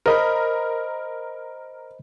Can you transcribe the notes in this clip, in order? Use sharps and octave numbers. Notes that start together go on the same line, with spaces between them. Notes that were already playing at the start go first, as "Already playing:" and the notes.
A#4 C5 D#5 B5